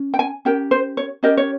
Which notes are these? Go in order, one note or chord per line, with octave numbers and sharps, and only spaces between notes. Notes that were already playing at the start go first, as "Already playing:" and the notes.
Already playing: C#4
G5
G#5
C#4 G4 A#4 G5
C5
C#5
C#4 G4 A#4 D#5
C#5